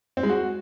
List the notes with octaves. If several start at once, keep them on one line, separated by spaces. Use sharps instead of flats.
C4
G#3
F#4